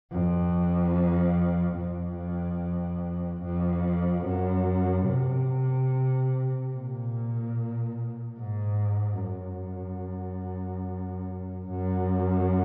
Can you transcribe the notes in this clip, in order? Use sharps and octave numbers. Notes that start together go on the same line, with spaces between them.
F2
F2
F2
F#2
C3
A#2
G#2
F#2
F#2